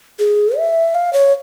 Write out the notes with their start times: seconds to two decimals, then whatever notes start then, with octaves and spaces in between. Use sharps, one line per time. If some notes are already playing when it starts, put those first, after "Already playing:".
0.19 G#4
0.57 E5
0.95 F5
1.13 C#5